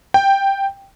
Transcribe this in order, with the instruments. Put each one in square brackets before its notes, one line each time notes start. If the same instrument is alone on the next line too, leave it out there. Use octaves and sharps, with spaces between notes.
[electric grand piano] G5